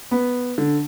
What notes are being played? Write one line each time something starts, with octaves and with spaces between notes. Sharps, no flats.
B3
D3